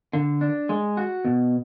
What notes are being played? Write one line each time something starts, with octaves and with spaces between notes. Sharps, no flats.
D3
D4
G#3
F#4
B2